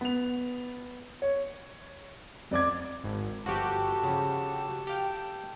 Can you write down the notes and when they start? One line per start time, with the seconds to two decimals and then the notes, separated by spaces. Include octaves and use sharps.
0.01 B3 F7
1.22 C#5
2.51 F2 D5 D6 G#6
3.04 G#1
3.46 G1 F3 F#4 G4 A4
4.03 C#3 F3
4.87 G4 F5 G5